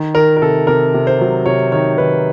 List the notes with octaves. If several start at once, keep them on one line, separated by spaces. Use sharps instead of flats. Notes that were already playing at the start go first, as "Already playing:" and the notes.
Already playing: D#3
D#3 A#4
A#4
C3 A4
C3 A#4
C3
C5
F#3
C3 C#5
D#3 C#5
D#3 B4